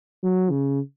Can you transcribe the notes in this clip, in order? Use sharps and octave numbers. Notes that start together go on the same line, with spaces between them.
F#3
C#3